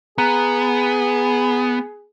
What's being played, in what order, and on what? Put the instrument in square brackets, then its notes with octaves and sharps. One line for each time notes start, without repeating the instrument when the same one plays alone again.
[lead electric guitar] B3 [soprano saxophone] G#4 [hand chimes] A#5 F#6